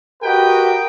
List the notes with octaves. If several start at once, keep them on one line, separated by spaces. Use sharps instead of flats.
F#4 G4 A#4 B4 D#5 G5